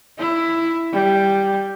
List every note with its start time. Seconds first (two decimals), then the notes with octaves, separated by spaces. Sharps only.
0.19 E4
0.93 G3